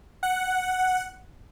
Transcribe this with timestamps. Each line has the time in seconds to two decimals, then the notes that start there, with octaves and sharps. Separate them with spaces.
0.23 F#5